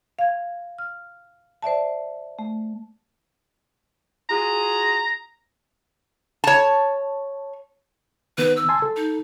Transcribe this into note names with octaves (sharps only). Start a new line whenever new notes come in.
F5 G#6
F6
C5 D5 E5 A5
A3
F4 F#4 G#4 A#5
C#5 A5
D#3 B3 B4
E6
G#5 A5 C6
A4
D#4